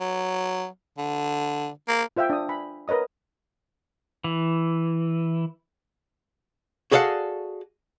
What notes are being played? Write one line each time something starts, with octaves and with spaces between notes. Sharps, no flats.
F#3
D3
A#3
F4 C5 E5 F5 G5
D4 D#6
G#5 B5
A#4 B4 C#5 D#5 D#6
E3
F#4 G#4 A4 D5 F5 F#5